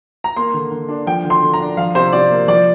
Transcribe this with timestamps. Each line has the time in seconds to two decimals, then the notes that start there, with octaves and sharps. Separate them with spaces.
0.24 A#5
0.36 A#3 C6
0.54 D3
0.71 D3
0.89 D4
1.07 F3 G5
1.24 D3
1.30 C6
1.42 D3
1.54 A#5
1.60 D4
1.77 F3 F5
1.95 C3 C5
2.13 C3 D5
2.31 A#3
2.48 F3 D5